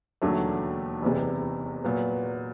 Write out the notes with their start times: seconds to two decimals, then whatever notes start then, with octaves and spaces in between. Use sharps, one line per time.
0.22 E1 D#2 D3 F#3 A3
1.02 F#1 E2 C3
1.84 A#2 F#3 B3